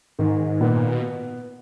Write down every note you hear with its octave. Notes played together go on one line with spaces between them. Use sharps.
G#2 D#3
A#2 B3
B2